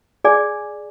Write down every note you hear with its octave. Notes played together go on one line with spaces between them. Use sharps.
G#4 D5 G#5